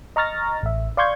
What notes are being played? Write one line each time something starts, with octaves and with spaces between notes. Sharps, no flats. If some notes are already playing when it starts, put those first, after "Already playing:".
D#5 A#5 C#6 F6 A6 A#6
A1 E5
D5 F5 C6 C#6 G6 G#6